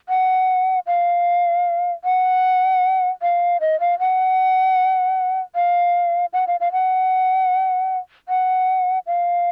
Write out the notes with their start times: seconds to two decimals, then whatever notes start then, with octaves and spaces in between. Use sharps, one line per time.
0.09 F#5
0.87 F5
2.04 F#5
3.22 F5
3.61 D#5
3.80 F5
3.99 F#5
5.55 F5
6.33 F#5
6.47 F5
6.60 F5
6.72 F#5
8.29 F#5
9.07 F5